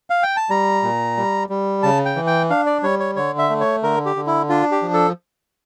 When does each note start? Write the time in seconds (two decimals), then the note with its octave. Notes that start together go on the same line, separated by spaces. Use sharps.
0.10 F5
0.23 G5
0.36 A5
0.49 G3 A#5
0.83 A#2
1.17 G3
1.49 G3
1.83 C#3 A5
2.05 G5
2.16 E3
2.27 G5
2.50 D4 F5
2.66 D5
2.83 G3 C#5
2.99 C#5
3.16 D3 C#5
3.38 E5
3.50 A3
3.60 C#5
3.83 D3 A#4
4.06 G4
4.16 D3
4.27 E4
4.49 D4 F4
4.71 G4
4.82 F3
4.94 A4